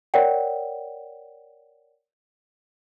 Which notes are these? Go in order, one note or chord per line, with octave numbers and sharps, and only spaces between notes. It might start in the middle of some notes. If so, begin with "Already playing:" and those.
A#4 C#5 D5 F#5 G5